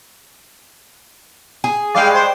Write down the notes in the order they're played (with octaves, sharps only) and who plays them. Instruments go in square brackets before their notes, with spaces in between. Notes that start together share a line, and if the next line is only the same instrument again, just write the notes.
[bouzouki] G#4
[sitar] G2 G#3 [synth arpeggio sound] D5 G5 [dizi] F5
[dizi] C5